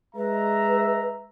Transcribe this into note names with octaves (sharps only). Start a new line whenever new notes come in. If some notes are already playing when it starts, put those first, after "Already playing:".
G#3 B4 E5 A#5